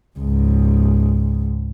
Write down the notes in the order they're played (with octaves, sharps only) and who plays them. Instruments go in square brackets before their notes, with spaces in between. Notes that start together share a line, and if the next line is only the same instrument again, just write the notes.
[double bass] C#2 G#2